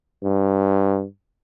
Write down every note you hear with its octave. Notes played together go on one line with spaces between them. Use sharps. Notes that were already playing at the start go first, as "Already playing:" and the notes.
G2